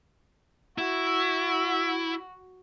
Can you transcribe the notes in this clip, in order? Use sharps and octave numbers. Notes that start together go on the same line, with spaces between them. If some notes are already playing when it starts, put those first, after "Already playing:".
E4 F#4